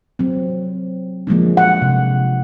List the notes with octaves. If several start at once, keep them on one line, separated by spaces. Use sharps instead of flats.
F#3 C4
F3 G#3 A#3 D4
F#5
C3